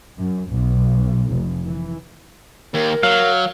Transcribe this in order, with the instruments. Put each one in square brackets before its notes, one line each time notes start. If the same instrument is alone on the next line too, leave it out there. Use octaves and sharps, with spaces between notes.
[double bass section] F#2
B1
F1
E3
[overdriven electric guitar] D#2 [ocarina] A#4
[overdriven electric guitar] F#3 [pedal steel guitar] F5